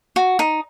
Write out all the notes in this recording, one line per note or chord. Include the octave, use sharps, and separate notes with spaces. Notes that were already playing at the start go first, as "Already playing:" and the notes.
F#4
D#4